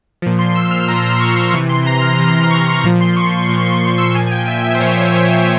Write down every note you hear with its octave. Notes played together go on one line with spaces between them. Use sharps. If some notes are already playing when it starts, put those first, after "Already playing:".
A#2 F3
C6
E6
F6
A#2 F3 A#5
C6
C#6
C6
C3 E3 C#6
C6
A#5
F6
C3 E3
F6
C#6
C6
A#2 F3 A#5
C6
C#6
A#2 F3 C6
C6
E6
A#2 F3 G#5
G#5
G5
E5
E5
C5
A#2 F3 C#5
C#5